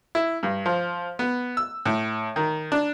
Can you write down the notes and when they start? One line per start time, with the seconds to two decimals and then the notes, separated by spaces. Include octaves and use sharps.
0.15 E4
0.43 G2
0.66 F3
1.19 B3
1.57 E6
1.86 A2
2.36 D#3
2.72 D4